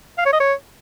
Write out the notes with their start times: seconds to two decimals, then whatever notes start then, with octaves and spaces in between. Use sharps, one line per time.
0.18 F5
0.25 C#5
0.33 D#5
0.40 C#5